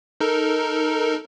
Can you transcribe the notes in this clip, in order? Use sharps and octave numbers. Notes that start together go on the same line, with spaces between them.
D#4 A4 A#4